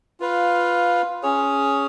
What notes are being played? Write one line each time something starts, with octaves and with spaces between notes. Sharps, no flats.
F4 B4 F5
C#4 G#4 C#5